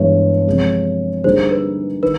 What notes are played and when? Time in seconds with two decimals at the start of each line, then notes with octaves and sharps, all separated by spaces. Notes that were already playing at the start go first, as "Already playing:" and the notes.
Already playing: G2 E3 G#3 B3 C#5
0.47 C3 F3 G#3
1.24 D3 G3 A#3 D#4 G#4 C5
1.51 B4
2.03 D#3 B4